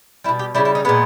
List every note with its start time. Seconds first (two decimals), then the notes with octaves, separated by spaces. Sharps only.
0.24 G3 E4
0.29 B2
0.39 G4
0.55 C#3 G3 E4
0.65 E4
0.75 D#4
0.85 A#2 G#3 B3